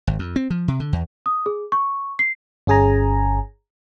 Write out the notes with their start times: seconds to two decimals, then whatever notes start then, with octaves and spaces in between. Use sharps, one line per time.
0.07 G#1
0.19 F2
0.36 C4
0.50 F3
0.68 C3
0.80 D3
0.93 E2
1.26 D#6
1.46 G#4
1.72 C#6
2.19 C7
2.67 G1 C#4 G#4 G#5 A#5